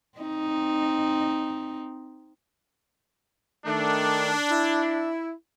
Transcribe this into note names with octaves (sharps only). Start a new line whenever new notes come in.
C4 D#4
D#3 A3 D4
E4